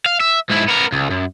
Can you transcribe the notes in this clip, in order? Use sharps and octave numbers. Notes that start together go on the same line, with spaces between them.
F5
E5
G#2 E4
B3 A#4
C#2
F#2